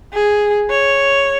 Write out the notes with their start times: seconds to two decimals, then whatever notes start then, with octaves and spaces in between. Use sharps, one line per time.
0.13 G#4
0.70 C#5